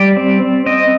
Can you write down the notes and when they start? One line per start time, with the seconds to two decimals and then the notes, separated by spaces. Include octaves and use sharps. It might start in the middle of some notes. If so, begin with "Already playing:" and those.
Already playing: G3 D5
0.17 C4
0.42 C4
0.66 C4 D#5